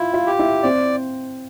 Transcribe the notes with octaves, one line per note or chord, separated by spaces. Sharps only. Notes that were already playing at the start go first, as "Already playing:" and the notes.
Already playing: E4 F4
F4
G4
E4
C4 D5